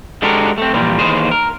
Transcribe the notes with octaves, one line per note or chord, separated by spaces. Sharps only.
G#3 D4 F#4 G4 A4 A#4
A3 C4
A#2 E3 F3 G3 A#3
D#2 E3 G#4 C5
A#4